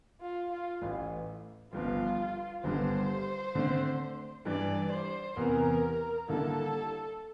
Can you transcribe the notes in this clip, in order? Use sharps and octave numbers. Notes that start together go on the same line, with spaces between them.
F4
F4
A1 A2 E3
G1 G2 F3 F4
G1 G2 D3 G3 C5
D3 A3 C4
G2 E3 G3 D4 D5
C5
E2 C3 E3 A#4
D3 G3 A#3 E4 A4